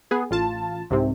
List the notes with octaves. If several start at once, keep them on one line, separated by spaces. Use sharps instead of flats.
B3 G#4
A1 F4 A5
C2 G#2 C3